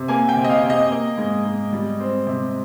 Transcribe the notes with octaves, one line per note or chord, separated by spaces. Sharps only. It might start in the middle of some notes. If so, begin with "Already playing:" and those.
Already playing: C3
A#3 G#5
G5
C3
D#5
F5
C3
D#5
A#3
G#2
G#2
G3
C4
C3